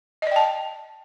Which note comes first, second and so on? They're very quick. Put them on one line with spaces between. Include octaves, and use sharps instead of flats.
D#5 D5 G5 A5